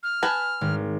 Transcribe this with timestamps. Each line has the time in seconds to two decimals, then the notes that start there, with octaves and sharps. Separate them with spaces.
0.03 F6
0.23 B4 G#5 A5
0.61 G#1